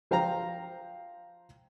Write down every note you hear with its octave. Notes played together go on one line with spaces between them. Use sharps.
F3 C5 F5 G5 A#5